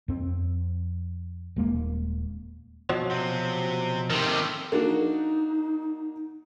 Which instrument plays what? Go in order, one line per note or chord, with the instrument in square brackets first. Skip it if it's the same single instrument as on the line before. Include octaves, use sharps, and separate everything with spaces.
[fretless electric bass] F2 C4
D#1 G#3 A#3
[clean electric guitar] B2 F3 F#3
[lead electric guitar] C3 C4
[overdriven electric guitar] C3 D#3 [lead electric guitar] A4 G5
[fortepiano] A#3 D4 F#4 [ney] D#4